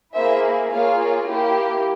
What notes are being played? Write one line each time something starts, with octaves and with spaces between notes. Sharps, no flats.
A#3 E4 G#4 C5 E5
A#3 F4 G#4 C#5 F5
A#3 E4 G4